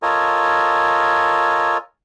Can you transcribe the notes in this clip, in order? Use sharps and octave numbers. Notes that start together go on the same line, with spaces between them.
F4 A4 A#4 C#5 D#5 G#5